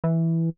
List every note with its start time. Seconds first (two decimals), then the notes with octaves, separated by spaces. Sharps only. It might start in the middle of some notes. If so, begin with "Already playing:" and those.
0.04 E3